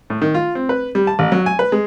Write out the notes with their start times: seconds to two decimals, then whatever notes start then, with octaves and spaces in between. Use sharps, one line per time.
0.10 A2
0.22 D#3
0.34 F4
0.55 C4
0.69 B4
0.95 G3
1.07 A5
1.19 A1
1.32 F#3
1.46 G#5
1.59 B4
1.72 G#3